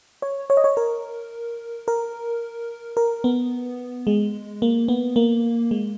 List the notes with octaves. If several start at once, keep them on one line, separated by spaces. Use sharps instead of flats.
C#5
C#5
D#5
C#5
A#4
A#4
A#4
B3
G#3
A#3
B3
A#3
G#3